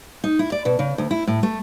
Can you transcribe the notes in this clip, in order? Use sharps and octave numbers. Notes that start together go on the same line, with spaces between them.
D#4
E4
D5
B2
C#3
D2
E4
A2
A3